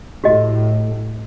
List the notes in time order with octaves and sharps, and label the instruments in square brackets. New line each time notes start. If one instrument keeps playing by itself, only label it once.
[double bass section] A2 [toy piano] F#4 G4 D#5